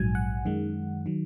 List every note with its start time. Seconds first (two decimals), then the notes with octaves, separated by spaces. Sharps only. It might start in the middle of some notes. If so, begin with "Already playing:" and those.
Already playing: A#1 G#2 F#3 G#5
0.15 F#5
0.45 F#2 D#3 G#3
1.06 D#3 F#3